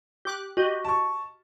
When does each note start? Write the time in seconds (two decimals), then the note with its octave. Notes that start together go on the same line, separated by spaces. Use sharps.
0.25 G4 D6 F#6
0.57 F#4 G4 D#5
0.85 A5 C#6